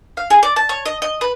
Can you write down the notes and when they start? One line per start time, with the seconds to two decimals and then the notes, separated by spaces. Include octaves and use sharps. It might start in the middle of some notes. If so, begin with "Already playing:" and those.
0.17 F5
0.30 G#4
0.43 D5
0.56 A5
0.69 C#5
0.86 D#5
1.02 D#5
1.21 B4